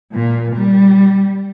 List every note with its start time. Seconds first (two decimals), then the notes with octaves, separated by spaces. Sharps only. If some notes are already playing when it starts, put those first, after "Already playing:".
0.13 A#2
0.56 G3